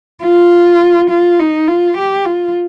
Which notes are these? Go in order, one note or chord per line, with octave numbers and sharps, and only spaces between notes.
F4
F4
D#4
F4
G4
F4